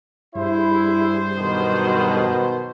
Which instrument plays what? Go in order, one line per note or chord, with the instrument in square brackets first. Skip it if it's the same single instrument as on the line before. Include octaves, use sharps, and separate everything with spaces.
[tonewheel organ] G2 G3 G#4 [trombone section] E4 [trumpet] C5
[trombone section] B2 [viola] D#3 F#3